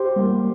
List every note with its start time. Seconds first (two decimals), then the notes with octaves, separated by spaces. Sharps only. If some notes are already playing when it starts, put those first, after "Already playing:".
Already playing: G4 C5
0.16 G3 A#3